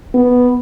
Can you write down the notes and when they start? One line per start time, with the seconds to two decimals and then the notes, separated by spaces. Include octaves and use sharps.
0.14 B3